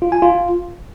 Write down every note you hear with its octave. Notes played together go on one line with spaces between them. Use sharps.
F4
G#5
F4